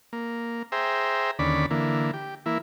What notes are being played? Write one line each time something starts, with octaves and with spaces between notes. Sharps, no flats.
A#3
G#4 C5 E5 G5 A#5
D#2 D3 C#4 D5 B5
D3 E3 A#3
G4
E3 A#3 E4